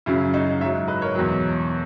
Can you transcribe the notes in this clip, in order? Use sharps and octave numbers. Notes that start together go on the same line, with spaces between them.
F#2 C#3 F#3 C#4 E4
D#4 F#4
G#2 F#3 C#5 E5
B4 D#5
A#4 C#5
E2 B2 F#3